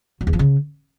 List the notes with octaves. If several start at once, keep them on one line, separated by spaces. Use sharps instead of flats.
F#3
E2
F3
C#3